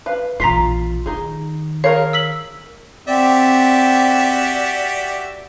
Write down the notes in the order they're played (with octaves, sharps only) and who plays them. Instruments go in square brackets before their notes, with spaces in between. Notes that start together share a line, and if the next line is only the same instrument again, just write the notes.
[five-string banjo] B4 F5
[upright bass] A#1 E3 [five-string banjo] F4 [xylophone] A#5 B6 C7
[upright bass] D#3 [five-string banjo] D#4 G#4
[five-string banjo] G#4 A#4 C#5 [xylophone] F5
[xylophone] E6 B6 F#7
[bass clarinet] C4 [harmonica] F#4 G4 E5 [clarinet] D5